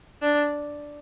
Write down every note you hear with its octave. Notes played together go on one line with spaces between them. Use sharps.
D4